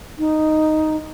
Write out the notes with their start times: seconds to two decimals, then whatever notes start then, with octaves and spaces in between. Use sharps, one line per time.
0.19 D#4